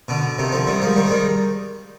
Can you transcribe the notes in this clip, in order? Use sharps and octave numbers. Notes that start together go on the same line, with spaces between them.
B2 D3
C3 D#3
D3 F3
D#3 G3
F3 G#3
D#3 G3
G#3
D#3 G3